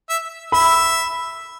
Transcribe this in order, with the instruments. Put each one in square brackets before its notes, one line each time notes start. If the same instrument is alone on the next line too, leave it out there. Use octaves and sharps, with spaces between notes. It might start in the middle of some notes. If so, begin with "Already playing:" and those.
[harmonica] E5
[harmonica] E5 [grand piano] B5